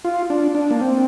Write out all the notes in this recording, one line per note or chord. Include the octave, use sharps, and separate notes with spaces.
F4
D4
D4
A#3
C4